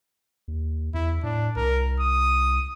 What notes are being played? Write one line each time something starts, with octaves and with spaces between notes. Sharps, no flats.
D#2
E2 E4
A2 D4
C2 A#4
D#6